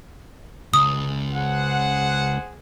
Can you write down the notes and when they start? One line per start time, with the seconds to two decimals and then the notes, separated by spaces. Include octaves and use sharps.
0.74 C#2 D#6
1.33 G#4 C5 F#5